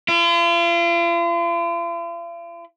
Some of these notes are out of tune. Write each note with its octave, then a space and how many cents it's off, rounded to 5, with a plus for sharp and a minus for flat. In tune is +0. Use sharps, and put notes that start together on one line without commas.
F4 -45